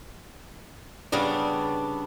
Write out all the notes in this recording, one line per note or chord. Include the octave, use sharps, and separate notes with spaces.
C#3 G3 B3 D4